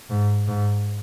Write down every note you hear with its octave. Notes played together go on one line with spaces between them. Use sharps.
G#2
G#2